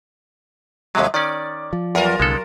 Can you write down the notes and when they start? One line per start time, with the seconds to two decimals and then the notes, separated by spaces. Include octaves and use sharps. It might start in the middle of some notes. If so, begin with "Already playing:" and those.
0.95 D#2 C3 F#3 G3
1.14 D#3 C#4 D5
1.73 F3
1.95 E2 F#3 F4 A#4
2.20 C2 D3 G#3 B3 A4